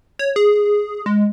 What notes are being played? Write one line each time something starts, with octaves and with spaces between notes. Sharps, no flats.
C#5
G#4
G#3